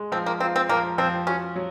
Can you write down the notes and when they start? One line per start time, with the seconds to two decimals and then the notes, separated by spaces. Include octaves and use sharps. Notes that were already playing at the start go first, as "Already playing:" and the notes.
Already playing: G#3
0.12 F3 C4
0.26 A#3
0.40 C4 F4
0.56 C4
0.69 F3 A#3
0.98 F3 C4
1.27 C#4 F#4
1.56 F#3